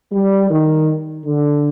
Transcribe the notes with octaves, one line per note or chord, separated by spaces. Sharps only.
G3
D#3
D3